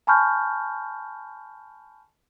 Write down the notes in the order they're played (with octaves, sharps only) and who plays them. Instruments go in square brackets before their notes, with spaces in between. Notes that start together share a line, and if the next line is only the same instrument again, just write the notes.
[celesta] G#5 A5 B5 C#6 F6 G6